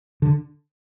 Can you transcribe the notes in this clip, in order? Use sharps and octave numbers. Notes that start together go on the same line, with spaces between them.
D3